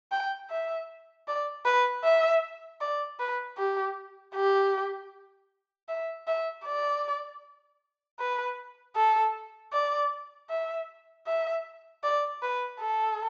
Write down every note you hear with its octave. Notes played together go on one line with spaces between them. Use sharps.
G5
E5
D5
B4
E5
D5
B4
G4
G4
E5
E5
D5
B4
A4
D5
E5
E5
D5
B4
A4